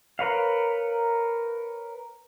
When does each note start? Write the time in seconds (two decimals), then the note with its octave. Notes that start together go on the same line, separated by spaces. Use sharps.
0.19 A#4 B4 C#5 F5